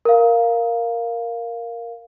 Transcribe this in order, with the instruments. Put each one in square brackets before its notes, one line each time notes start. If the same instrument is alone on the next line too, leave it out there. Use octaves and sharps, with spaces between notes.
[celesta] A#4 F5